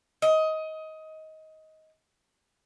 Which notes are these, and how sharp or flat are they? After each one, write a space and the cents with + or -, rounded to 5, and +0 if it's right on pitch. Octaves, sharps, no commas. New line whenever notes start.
D#5 +20